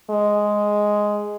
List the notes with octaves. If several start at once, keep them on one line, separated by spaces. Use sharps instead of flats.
G#3